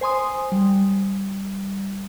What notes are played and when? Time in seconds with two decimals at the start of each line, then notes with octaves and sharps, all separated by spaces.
0.01 C5 G#5 C6 D#6
0.52 G3